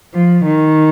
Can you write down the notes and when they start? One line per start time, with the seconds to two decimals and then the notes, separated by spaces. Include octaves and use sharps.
0.14 F3
0.46 D#3